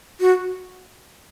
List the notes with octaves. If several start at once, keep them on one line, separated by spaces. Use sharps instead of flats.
F#4